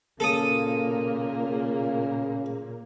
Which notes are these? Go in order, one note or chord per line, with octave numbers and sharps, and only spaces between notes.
A#2 C#3 A#3 A4 D#6